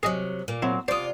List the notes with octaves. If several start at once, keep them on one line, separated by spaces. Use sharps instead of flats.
C3 F#3 G#4 D#5
A#2 A#3
F#3 C4 E4
C3 F4 C5 D5 D#6